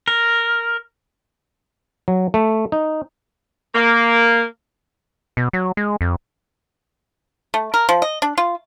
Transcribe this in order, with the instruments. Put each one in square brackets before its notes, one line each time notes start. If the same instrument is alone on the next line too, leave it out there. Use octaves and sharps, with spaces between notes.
[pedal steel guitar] A#4
[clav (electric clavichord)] F#3
A3
D#4
[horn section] A#3
[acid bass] B2
F#3
G#3
F2
[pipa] A3
A#4
F3
D#5
D4
F4